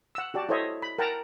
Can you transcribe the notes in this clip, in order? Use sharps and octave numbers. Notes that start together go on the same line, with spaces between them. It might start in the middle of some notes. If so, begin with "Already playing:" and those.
F#5 E6
F#4 G4 D5 A5
E4 A4 C5 C#5 D#5 E5
B5
A#4 F#5 G5 A5 A#5